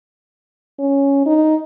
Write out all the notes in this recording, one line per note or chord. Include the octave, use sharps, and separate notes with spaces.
C#4
D#4